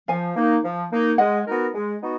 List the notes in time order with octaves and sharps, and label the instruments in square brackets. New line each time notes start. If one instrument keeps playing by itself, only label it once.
[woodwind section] F3 [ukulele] F5 G#5
[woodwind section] A#3 D#4
F3
A#3 D#4
[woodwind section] G#3 [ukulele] D#5 F#5
[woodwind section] B3 D#4 F#4 A#4
G#3
B3 D#4 F#4